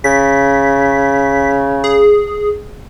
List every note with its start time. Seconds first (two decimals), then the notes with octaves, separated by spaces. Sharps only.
0.04 C#3 B6
1.84 G#4